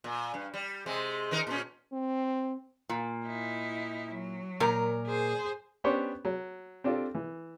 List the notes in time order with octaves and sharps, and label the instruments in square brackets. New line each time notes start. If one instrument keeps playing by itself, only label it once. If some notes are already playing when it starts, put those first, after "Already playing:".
[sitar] A#2
G2
G3
C3 G#3
D#3 D#4 A#4
A#2 C#4
[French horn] C4
[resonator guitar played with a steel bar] A#2
[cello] D#4 E4
F#3
[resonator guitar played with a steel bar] A#2 A#4
[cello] G#4 C5
[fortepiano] B3 C#4 D4 G4 C5 C#5
F#3
C4 D4 F4 G4 A4
E3